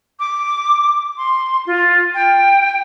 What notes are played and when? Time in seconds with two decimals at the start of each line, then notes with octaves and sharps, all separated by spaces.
0.20 D6
1.17 C6
1.66 F4
2.15 G5